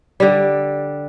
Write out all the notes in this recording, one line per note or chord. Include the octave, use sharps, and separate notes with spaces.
D3 G3